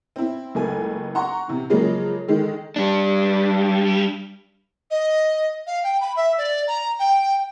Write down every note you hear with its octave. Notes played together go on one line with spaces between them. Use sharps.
C4 E4
F#1 C#2 A3 G#5
F#5 A#5 C6 C#6
C3 E3
C#3 F3 F#3 G#3 A#3
D3 D#3 G#3
G3 D4
D#5
F5
G5
B5
E5
D5
A#5
G5